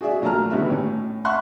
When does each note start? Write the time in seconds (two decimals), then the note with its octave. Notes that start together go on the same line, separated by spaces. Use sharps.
0.01 F#4 G#4 D5 E5
0.22 A#1 F#3 A3 A5 A#5 F6
0.50 G#1 D3 G3 B3 F#4 E5
0.70 A2 C#4
1.25 E5 F#5 C6 C#6 F#6